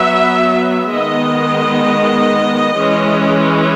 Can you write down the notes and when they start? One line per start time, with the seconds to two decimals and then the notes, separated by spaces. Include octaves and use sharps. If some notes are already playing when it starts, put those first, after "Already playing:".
Already playing: F#3 B3 E5
0.91 D#3 G#3 B3 D#5
2.77 E3 G#3 C#4